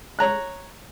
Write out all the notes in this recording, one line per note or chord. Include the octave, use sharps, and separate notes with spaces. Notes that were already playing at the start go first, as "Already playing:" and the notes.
C#5 A#5 F#6